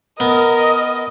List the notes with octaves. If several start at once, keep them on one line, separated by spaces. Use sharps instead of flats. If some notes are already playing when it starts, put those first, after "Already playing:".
B3 A#4 D#5